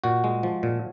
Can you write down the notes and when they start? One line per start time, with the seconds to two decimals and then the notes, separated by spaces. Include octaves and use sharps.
0.04 A#2 F#4
0.24 G#3
0.43 F3
0.63 A#2